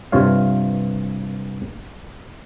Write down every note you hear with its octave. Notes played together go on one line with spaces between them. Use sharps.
G2 C3 F4 C#5 F5